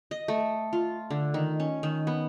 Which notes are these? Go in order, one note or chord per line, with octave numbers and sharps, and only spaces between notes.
D#5
A3
F4
D3
D#3
C#4
D#3
B3